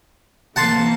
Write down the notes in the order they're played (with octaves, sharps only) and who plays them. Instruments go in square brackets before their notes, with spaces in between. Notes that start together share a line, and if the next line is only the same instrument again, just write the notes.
[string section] E3 A#3 C4 [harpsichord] F#5 A5 C6